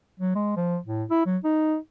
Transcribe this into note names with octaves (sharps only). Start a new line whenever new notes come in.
F#3
G#3
F3
A2
E4
F#3
D#4